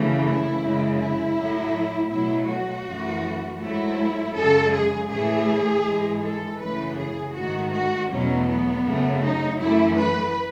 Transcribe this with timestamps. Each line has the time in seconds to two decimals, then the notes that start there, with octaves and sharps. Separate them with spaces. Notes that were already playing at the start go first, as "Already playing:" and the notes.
Already playing: F#2 C#3 E3 A3
0.24 E4
0.61 F#2 C#3 G#3
0.99 E4
1.36 A2 F#3 A3
2.11 B2 F#3 A3 E4
2.48 F#4
2.86 F#2 E3 A3
3.61 G#2 F#3 A3 E4
4.35 F#2 C#3 G#3 A4
4.73 G#4
5.10 A2 E3 A3 G#4
5.86 G#2 E3 G#3
6.23 A4
6.60 F#2 C#3 E3 A3 B4
6.98 G#4
7.35 G#2 D#3 A3 F#4
7.73 F#4
8.10 E2 B2 F#3 A3 C#4
8.48 B3
8.85 F#2 C#3 F#3 A3
9.23 D#4
9.60 F#2 E3 A3 E4
9.97 B4